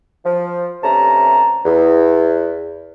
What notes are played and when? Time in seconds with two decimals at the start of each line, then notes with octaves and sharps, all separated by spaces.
0.25 F3
0.83 G2 C3 A3 C#4 A5 A#5
1.65 E2